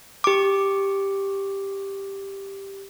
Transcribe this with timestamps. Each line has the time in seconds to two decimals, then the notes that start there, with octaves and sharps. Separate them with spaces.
0.24 G4 D6